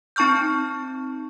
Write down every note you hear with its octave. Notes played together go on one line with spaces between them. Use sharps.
C4 D#4 A5 C#6 F6 G6